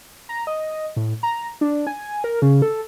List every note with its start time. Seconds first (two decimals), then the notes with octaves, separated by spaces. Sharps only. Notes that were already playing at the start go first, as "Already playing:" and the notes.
0.29 A#5
0.47 D#5
0.96 A2
1.23 A#5
1.61 D4
1.87 G#5
2.24 A#4
2.42 C#3
2.62 A4